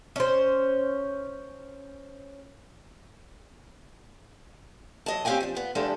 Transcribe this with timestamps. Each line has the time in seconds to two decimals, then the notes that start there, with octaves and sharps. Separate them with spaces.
0.16 C#4 C5
5.06 F#3 D#5 A5
5.25 C4 C#4 G4 F5 G5 G#5
5.41 F3 D4
5.55 B3 F4
5.75 E2 G3 G#3 D4 A4 F5